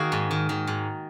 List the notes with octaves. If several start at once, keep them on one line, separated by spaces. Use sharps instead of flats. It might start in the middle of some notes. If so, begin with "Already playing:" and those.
Already playing: D#3 A#3 F#4 G#4
G#2
D#3
D#3
G#2